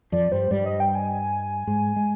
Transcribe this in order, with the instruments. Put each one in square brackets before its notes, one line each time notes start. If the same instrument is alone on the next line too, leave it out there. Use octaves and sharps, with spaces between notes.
[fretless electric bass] F2 F3 [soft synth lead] D5
[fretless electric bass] G2 G3 [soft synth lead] C5
[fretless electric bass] G2 G3 [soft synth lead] D5
[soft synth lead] D#5
G5
G#5
[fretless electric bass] G#2 G#3
G#3